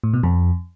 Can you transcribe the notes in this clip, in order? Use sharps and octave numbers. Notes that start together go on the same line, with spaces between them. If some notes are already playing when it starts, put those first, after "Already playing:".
A2
B2
F2